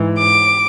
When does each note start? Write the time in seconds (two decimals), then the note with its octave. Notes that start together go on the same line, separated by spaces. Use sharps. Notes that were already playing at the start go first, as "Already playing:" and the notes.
Already playing: G#2 E3
0.18 D6